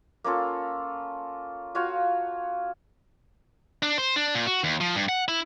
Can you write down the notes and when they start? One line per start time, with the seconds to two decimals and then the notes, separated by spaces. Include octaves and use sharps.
0.24 A#3 C#4 F4 A4
1.75 F4 F#4 C#5 F5
3.83 D4
3.98 C5
4.16 D4
4.35 A#2
4.47 F#4
4.64 D#2
4.81 F3
4.95 G2
5.09 F#5
5.28 E4